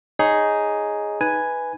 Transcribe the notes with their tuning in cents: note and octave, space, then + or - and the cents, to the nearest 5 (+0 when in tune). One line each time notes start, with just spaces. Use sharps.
D#4 +0 G#4 +0 C#5 +0
D#4 +0 B4 +0 G#5 +0